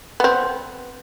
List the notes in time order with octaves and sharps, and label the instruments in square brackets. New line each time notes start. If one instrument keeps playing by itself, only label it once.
[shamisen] B3 C4